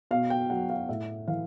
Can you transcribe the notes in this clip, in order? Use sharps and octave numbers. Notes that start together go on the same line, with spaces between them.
B2 F5
G5
F#3 F#5
F5
A2 E5
E3 F5